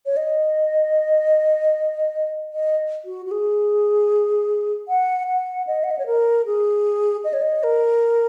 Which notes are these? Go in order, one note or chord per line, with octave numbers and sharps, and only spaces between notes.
C#5
D#5
D#5
F#4
F#4
G#4
F#5
F#5
D#5
F#5
D#5
C#5
A#4
G#4
D#5
C#5
D#5
A#4